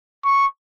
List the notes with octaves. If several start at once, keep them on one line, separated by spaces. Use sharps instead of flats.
C#6